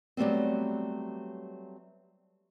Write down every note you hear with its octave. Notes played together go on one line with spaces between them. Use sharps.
F#3 G3 A3 B3 C4